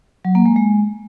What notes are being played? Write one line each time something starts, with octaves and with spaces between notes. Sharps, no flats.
F#3
A#3
G#3
G#3